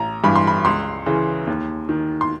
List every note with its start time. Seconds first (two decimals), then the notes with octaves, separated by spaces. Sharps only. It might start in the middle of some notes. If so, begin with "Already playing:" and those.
Already playing: A1 A#5
0.23 G2 E3 B5
0.36 C6
0.47 B5
0.65 C#2 C6
1.06 C#3 E3
1.47 D#2
1.89 D#3
2.21 C6